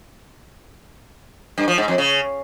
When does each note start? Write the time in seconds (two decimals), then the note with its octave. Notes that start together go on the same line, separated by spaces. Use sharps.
1.58 G2
1.68 F3
1.78 G#2
1.88 F2
1.98 C#3